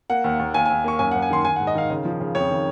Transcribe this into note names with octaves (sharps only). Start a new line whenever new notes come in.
A#3 F#5
D#2
D#2
D#2 G#5
G#5
D#2
A#3 C#6
F#2 G#5
F#5
F#2
G#5
D#3 C6
D#3 G#5
F#5
G#2
D#5
D#3 F5
C#3
F3
C#3
F2 C#5
D#3